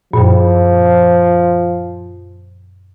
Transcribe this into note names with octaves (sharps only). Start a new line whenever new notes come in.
F#2 A#2 F3